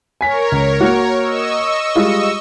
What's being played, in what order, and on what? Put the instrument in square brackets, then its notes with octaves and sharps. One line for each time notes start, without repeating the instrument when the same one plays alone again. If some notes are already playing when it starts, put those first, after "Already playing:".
[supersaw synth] A#4 C#5 [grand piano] G#5 B6
[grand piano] C#2
A#3 F#4
[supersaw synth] D#5 C#6 E6
[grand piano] G3 G#3 F4